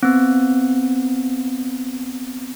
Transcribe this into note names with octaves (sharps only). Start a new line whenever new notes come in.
B3 C4